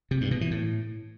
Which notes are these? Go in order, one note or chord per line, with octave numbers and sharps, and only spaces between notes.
C3
G2
B2
E3
A2